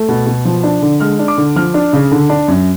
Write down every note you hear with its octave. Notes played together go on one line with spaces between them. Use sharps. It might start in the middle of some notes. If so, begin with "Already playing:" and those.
Already playing: A3
B2
B2
F3
D4
D3
G#3 F6
D4
D6
D3
F3 F6
D4
C#3
D3
D4
F#2